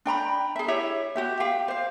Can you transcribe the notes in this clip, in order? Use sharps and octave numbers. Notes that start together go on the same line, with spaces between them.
D4 G5 A#5 B5
G#4 E5
E4 G4 C#5 E5
F#4 G4 E5
G4 F5 G5
C5 F5